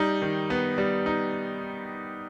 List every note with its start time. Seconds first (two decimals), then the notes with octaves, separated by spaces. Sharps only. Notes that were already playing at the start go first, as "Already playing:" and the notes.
Already playing: G3 D#4
0.22 D#3
0.50 B3
0.78 G3
1.06 D#4